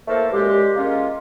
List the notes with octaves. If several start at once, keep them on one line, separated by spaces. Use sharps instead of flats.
E3 A3 A#3 A4 A#4 C5
F#2 A#2 G#3 G4
G#3 A#3 C#4 F4